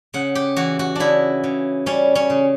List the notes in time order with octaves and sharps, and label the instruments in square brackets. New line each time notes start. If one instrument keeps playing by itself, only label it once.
[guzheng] C#3 F#5
G4
E3 F#4
F#4
C#3 D4 E4
C#3
G3 C#4
C#4
C#3